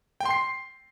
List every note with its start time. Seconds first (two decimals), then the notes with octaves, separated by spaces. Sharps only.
0.20 G5
0.25 C6
0.31 C7